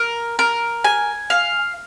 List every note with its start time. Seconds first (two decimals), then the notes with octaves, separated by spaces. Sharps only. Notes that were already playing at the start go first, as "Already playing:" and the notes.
Already playing: A#4
0.39 A#4
0.84 G#5
1.30 F5